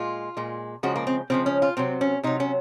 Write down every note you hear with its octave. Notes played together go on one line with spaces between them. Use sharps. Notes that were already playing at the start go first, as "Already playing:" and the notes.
Already playing: A#2 G#3 F4
A#2 G#3
C#3 F3 G#3 F#4
A#3
C4
C#3 F3 G#3 C4
C#4
F4
C3 F#3 C4
C#4
C3 F#3 D#4
C#4